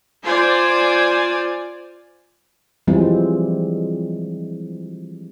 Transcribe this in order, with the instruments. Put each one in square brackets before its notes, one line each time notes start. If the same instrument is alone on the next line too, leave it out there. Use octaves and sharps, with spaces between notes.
[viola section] F4 C5 D5 G#5
[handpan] E3 F3 G3 G#3 C4